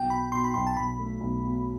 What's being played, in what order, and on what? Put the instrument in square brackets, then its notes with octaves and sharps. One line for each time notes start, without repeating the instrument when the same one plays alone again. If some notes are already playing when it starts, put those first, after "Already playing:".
Already playing: [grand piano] B1 [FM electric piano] G5
[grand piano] B2 [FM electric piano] B5
[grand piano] B2 [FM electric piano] C6
[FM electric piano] B5
[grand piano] B1 [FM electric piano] C6
[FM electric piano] A5
[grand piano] B1 [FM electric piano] B5
[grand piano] A3
B1
B2